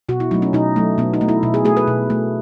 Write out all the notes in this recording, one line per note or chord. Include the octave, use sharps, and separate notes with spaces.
B2 F#4
E4
F#3 A3 D#4
C#4
B2 D#4
F#3 A3
B2 B3
D#4
A3
E4
B2
G#4
A3 G#4
B4
B2
A3